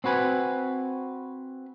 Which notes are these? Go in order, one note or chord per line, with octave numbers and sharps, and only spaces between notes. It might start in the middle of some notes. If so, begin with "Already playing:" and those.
C4 F#4 B4 G#5